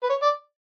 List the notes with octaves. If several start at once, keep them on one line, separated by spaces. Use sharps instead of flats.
B4
C#5
D5